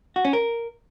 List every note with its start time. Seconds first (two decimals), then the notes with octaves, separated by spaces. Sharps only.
0.16 F#4
0.25 C#4
0.33 A#4